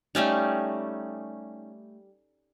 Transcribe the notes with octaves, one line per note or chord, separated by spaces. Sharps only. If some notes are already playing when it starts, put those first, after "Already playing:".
G3 A3 C#4 D#4